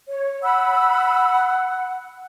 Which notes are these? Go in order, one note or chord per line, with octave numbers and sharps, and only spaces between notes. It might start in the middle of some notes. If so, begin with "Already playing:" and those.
C#5
F#5 B5 E6